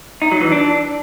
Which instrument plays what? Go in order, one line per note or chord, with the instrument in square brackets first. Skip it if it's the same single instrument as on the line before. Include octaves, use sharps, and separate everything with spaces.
[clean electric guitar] D#4
F#3
E3
D4